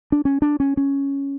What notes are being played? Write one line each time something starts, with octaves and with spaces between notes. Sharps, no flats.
D4
C#4
D4
C#4
C#4